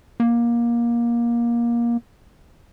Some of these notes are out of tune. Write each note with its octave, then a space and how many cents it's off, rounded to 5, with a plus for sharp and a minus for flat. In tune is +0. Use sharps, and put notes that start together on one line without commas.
A#3 +20